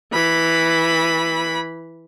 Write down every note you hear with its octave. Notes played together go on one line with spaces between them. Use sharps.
E3 B5